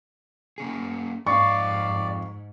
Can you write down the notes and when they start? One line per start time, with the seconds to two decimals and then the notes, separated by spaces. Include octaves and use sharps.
0.58 A#3 C#4 G#4
1.26 F2 G#2 D5 F5 C#6